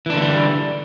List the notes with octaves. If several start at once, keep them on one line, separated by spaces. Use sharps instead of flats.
D3 E3 G3 A#3 D4